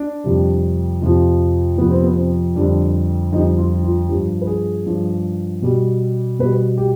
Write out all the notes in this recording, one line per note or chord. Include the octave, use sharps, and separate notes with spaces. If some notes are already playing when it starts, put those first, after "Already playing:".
Already playing: D4
F2 C3 G3
F2 C3 F3
F2 C3 F3 B3
C4
B3
C4
F2 D3 G3 D4
F2 D3 G3 D#4
F4
F4
G2 F3 G4
B4
G#4
G2 F3
B2 G3
B2 G3 B4
G4